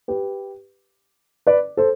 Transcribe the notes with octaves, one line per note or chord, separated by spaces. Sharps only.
G4 B4
B4 D5
A4 C5